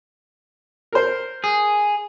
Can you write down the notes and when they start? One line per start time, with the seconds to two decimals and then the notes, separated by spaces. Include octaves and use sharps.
0.92 A#4 C5
1.44 G#4